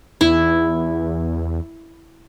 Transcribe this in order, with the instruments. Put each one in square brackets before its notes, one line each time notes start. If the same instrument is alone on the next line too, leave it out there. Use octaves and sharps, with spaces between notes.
[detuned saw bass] E2 [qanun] E4